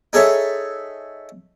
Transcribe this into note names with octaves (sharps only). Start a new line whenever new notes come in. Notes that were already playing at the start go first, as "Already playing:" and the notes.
D#4 G#4 A4 C#5 E5